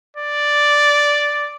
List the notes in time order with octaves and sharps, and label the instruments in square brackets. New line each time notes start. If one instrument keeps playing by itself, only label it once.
[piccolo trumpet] D5